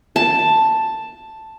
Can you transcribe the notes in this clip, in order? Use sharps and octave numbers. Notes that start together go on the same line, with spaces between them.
A5